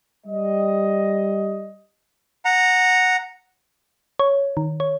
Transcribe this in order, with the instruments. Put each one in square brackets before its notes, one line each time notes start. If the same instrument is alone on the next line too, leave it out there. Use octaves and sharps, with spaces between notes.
[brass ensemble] G3 D#5
[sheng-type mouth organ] F#5 A#5
[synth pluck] C#5
D#3
C#5